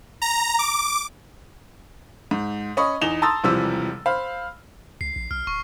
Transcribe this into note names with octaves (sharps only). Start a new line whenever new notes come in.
A#5
D6
G#2
C#4 D#5 B5 C#6
E2 D#4 E7 F7 G7
A5 A#5 C6 D#6 E6 A6
E1 C3 E3 F3 G3 E6
C5 F5 B5
C#2 C7
A#1
B1 F6
D1 C#6